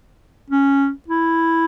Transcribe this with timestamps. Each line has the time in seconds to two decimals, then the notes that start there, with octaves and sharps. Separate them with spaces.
0.50 C#4
1.08 E4